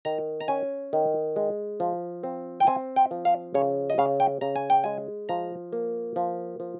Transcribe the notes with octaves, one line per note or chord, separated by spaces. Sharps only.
D#3 A#5
A#5
C#4 G#5
D#3
G#3
F3
C4
G5
C4 G#5
G5
F3
F5
C#3 C#5
D#5
C#3 F5
G5
C#3 A#5
G#5
G5
G#3 G#5
F3 A#5
A#3
F3
F3